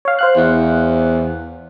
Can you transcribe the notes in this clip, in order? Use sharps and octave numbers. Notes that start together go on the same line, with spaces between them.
C#5 F5
C5 F5 F#6
E2